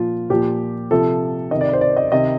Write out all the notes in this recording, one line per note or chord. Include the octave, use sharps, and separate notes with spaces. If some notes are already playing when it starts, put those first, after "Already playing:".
Already playing: A#2 F3 F4
A#2 F3 G4
C3 F3 A4
C3 D#3 D#5
D5
C5
D5
D#5
C3 D#3 D#5